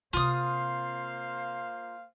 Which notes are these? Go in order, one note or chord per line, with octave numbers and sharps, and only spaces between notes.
C3 A#3 C4 F4 C5 F5 D#6